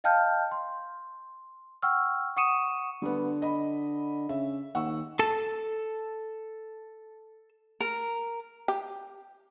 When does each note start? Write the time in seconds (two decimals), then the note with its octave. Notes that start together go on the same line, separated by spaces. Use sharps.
0.04 D#5 F5 G5 A5 F6 G6
0.51 C6
1.82 F#5 G5 C#6 E6 F6
2.37 F#5 C#6 D#6 C#7 D#7 E7
3.02 D3 G3 B3
3.42 D#5 B5
4.29 C#3 E5
4.75 D#2 F#5 C#6 E6
5.19 A4 A5
7.80 A#4
8.68 G4